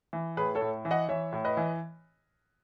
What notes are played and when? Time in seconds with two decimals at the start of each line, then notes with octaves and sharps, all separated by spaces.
0.13 E3
0.37 A2 G#4 B4
0.55 A4 C#5
0.61 A2
0.85 E3
0.91 D#5 F#5
1.08 E3 C#5 E5
1.33 A2
1.45 B4 D#5
1.57 E3